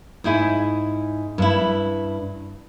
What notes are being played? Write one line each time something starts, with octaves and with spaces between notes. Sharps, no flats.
G#2 D#4 E4 G#5
G2 E4